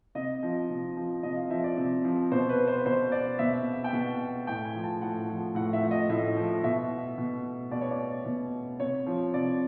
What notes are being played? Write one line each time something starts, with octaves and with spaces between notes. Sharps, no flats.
C3 D#5
F3
C3
F3
C3 D#5
F5
F3 E5
D5
C3
F3
B2 C5
B4
C5
B2 C5
D5
B2 E5
G5
B2 F#5
A2 G5
G#5
F3
A5
A2 F#5
F3
A2 F#5
E5
F3
D#5
A2 E5
F3
B2 E5
B2
B2 D5
C#5
D5
B2
C3 C#5
F3
C3 D5